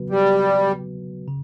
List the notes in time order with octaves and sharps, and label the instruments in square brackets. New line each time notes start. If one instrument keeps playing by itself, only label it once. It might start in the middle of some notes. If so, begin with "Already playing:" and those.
Already playing: [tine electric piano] C#3 F#3 B3 F#4 B4
[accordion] G3
[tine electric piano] C#3